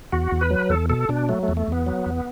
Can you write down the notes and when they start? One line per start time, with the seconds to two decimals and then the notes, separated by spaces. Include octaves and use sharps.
0.12 E2 F#4
0.32 E2
0.41 B4
0.51 F#3
0.69 E2 A4
0.90 B2 A4
1.09 B2 D4
1.29 F#3 A3
1.43 A3
1.48 E2
1.57 A3
1.68 E2 B3
1.86 F#3
2.06 E2